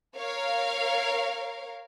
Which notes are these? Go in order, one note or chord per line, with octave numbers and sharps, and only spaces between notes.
A#4 C#5 F5